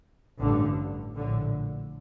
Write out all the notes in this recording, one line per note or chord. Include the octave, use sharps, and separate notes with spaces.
A1 G2 D3
A#1 A2 D3